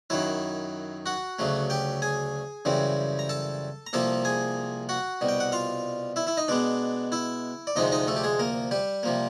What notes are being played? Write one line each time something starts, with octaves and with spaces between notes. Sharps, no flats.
F#2 D#3 F#3 E4 E5
F#4 F#5
D2 C#3 F#3 A3
G4 G5
G#4 G#5
F#2 C#3 E3 G3 C4
A#5
A4 A5
A#5
C2 C3 F3 A#3 A4 A5
G#4 G#5
F#4 F#5
C2 B2 G3
G5
F#5
F4 F5
E4 E5
E4 E5
D#4 D#5
B2 G#3 B3 D4 D5
E4 E5
D5
D2 C3 F3 G#3 D#4 D#5
D#4 D#5
A3 A4
G4
G#3 G#4
A#3 A#4
G3 G4
C3 F3 A#3